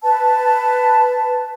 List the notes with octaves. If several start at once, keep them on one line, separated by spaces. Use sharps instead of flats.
B4 A5